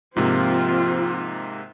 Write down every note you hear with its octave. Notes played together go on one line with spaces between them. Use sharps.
G#2 C3 F3 A#3 C4 F4